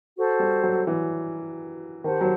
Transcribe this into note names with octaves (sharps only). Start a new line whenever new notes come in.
F#4 A4 C5
G3
F#3
E3
D#3 G4 C5 F#5 A5
F#3